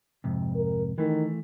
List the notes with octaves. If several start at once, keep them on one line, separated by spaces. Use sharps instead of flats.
F2 G#2 C3
A#4
D#3 E3 A3